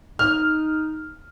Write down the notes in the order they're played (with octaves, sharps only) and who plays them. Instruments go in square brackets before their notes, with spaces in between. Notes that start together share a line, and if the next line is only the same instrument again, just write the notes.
[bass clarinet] D#4 [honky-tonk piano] F6